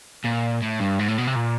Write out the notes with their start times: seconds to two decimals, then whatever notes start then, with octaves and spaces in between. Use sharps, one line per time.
0.24 A#2
0.62 A2
0.80 G2
0.99 G#2
1.08 A2
1.18 B2
1.27 C3
1.36 A#2